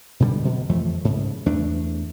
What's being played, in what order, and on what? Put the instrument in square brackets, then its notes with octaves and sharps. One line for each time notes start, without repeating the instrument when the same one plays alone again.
[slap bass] B2 D3 D#3 G3
B2 F#3
F2 E3 F3 A3
G#2 C#3
E2 A3 D4